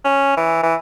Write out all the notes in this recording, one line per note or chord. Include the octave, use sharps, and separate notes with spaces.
C#4
E3
E3